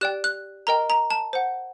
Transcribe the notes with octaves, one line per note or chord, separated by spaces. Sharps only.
G4 D5 G5 F#6
F#6
A#4 D#5 G5 A#5
A#5
A5
C5 F#5